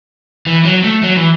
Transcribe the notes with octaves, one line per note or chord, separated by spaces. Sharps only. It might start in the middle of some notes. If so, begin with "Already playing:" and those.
E3
F#3
A3
F#3
E3